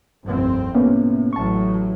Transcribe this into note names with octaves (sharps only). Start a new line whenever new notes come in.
F1 C2 G2 C4
A2 C3 A#3 B3 C#4
A1 A2 F#3 A5 C#6